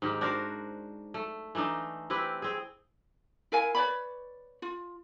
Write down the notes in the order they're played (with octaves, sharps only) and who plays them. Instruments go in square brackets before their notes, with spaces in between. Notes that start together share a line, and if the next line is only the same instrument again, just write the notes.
[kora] G#2 D#3 G4
D4 F#4 A#4 C5
A3
E3 A3 D4 D#4
C4 E4 G4 B4
C4 G#4
[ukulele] E4 A#4 F5 G#5
B4 C#5 D5 B5
F4